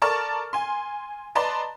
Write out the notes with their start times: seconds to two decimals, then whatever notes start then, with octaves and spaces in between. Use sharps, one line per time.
0.02 A4 A#4 D5 A5 C#6 F6
0.53 G#5 C6
1.35 B4 D5 D#5 A5 A#5 C6